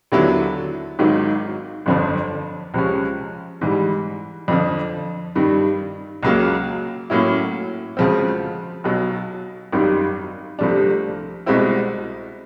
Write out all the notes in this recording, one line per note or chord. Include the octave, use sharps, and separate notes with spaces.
D#2 D3 F#3 B3 E4
G#1 G#2 D#3 F#3
G1 F2 D3 F3
C#2 C3 F3 G#3 C#4
G#2 E3 G3
F2 D3 F3
G2 D#3 G3
C#2 C#3 F#3 A#3
A2 F#3 A#3 C#4 E4
D2 C#3 F3 G#3 C4
B1 B2 F#3
G#1 F#2 D#3 G3
C2 C3 F3 A3 D4
C2 B2 G#3 C4 E4